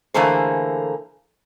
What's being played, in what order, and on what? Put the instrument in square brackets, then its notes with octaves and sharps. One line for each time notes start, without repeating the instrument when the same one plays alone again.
[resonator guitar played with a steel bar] D3 E3 A3 A#3 G#4 C5